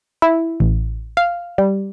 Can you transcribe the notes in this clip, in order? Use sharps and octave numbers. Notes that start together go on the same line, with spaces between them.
E4
A1
F5
G3